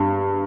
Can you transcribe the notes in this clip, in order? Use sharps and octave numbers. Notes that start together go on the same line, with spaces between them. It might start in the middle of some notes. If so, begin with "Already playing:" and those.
Already playing: G2